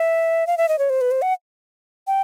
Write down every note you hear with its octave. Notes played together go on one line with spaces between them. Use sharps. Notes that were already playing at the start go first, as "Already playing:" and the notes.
Already playing: E5
F5
E5
D#5
C#5
C5
B4
C5
F#5
G5